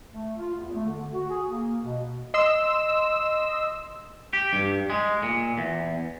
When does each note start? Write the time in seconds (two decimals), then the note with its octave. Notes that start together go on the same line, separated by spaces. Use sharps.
0.12 A3
0.38 F4
0.55 E2
0.74 A3
0.86 D3
1.12 F#4
1.29 G#4
1.50 A#3
1.82 B2
2.34 D#5 C6 E6
4.33 G4
4.53 G2
4.90 G#3
5.23 A#2
5.58 E2